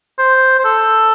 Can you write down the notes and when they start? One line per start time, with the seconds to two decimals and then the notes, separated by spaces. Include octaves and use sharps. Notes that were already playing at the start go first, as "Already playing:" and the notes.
0.18 C5
0.59 C5
0.64 A4